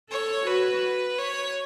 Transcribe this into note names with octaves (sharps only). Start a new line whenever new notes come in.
A4 C#5
F#4 B4
C#5